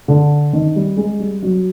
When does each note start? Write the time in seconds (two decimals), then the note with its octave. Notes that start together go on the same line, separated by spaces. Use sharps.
0.08 D3
0.53 D#3
0.76 G3
0.97 G#3
1.20 G3
1.42 F#3